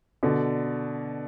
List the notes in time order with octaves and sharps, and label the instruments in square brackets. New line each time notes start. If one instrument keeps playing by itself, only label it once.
[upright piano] B2 D3